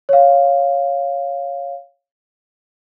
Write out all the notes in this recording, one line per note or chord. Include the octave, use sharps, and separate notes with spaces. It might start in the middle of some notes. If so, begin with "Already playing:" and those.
C#5 F5